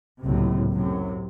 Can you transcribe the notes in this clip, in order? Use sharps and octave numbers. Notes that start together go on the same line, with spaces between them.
F#1 C#2 A2 C3
F#2 A2 C3